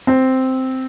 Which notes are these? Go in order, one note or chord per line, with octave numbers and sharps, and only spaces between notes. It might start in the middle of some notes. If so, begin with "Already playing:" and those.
C4